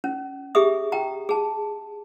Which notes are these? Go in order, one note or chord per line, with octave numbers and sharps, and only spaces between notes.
C#4
G4 G#4 E5 D#6
G5 A#5
G#4 A5